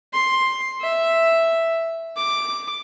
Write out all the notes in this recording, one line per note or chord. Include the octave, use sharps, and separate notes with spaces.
C6
E5
D6